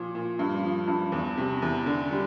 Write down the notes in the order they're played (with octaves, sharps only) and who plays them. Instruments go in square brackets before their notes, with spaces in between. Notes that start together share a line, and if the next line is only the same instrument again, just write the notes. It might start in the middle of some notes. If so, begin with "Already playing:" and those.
Already playing: [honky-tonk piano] A#2 F3
A#2
G2
F3
G2
E2
C3
E2
D3
G3